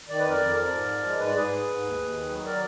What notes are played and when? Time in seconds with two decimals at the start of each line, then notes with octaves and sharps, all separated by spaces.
0.09 D#3 D5
0.19 B4
0.24 F2
0.29 A#4 D5
0.40 F2
0.56 F3 A#4 D5
0.72 G#2
0.87 F3
1.03 G#3
1.19 G#2 B4
1.28 D5
1.34 G#2 G#4 B4
1.51 G#2
1.67 G#2
1.82 D#2
1.98 D#2
2.14 D#3
2.29 F#3
2.45 A#4 D5